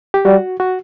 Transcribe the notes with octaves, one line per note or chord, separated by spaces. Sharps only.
G4
G3 F#4
F#4